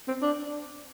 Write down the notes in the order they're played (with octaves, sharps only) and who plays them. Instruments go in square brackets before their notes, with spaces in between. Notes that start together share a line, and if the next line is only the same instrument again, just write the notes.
[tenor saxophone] C4
D4